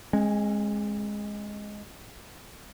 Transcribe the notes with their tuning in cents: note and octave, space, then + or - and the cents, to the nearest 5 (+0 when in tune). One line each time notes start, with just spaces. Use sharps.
G#3 +0 C#4 -45